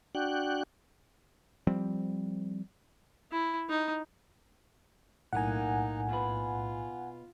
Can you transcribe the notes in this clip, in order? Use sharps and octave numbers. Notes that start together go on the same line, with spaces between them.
D4 F#4 G5 F#6
F3 G3 C4
E4
D#4
B1 A2 A#3 D#4 F#5 G#5
B2 F4 B4